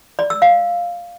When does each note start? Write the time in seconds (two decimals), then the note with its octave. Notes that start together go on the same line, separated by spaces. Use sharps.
0.19 D5
0.30 E6
0.42 F5